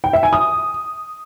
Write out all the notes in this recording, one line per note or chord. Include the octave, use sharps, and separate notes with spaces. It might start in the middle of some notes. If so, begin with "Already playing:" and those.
G5
E5
G#5
D#6